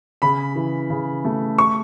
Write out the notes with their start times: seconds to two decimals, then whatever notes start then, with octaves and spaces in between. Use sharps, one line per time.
0.22 C#3 B5
0.55 E3
0.90 C#3
1.25 A3
1.58 C#6